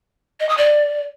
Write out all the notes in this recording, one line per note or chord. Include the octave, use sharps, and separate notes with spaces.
D#5
D#6
D5